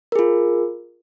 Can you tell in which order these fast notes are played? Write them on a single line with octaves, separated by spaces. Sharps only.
A#4 G#4 F4